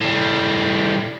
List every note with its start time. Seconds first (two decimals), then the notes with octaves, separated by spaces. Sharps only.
0.01 A2 G3